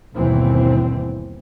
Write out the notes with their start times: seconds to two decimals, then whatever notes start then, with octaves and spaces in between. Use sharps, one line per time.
0.14 G1 D#2 B2 E3 C4